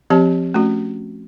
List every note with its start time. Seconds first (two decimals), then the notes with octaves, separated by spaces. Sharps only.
0.10 F3 C4 G4 C#5 A5
0.54 A3 C#4 F#4